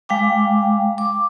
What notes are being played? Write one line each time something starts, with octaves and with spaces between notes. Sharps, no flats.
G#3 F5 G5 D6
D6